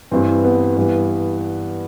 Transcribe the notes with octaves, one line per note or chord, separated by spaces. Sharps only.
G2 E3 C4
B3
G2 E3